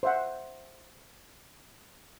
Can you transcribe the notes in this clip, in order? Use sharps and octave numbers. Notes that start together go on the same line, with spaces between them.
C5 E5 F#5